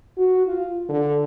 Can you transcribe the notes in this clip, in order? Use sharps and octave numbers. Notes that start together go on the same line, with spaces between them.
F#4
F4
D3